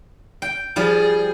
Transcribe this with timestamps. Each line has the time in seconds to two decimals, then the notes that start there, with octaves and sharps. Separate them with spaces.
0.42 G5
0.76 F3 G3 G#4